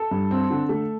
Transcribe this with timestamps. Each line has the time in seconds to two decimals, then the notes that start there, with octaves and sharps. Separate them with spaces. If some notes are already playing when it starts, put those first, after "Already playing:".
Already playing: A4
0.11 G2
0.31 C4
0.51 D3
0.69 A3